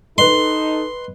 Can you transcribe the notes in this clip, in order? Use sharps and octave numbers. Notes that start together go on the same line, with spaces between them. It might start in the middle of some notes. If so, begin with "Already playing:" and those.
D#4 A4 B4 D#5 C6